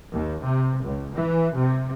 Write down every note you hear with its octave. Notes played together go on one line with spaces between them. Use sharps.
D#2
C3
C#2
E3
C3